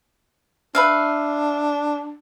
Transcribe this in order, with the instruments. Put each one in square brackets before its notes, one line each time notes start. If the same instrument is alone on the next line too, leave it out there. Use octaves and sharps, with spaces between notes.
[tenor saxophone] D4 [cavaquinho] B4 E5 F5